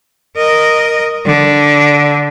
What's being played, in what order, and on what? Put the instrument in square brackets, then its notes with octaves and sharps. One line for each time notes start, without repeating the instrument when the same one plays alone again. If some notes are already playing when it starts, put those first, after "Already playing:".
[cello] A#4 D#5
D3